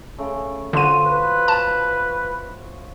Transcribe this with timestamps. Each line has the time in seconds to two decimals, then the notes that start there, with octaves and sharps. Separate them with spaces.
0.18 C#3 A3
0.73 D3 F4 F#4 C5 D#7
1.05 B4
1.48 A5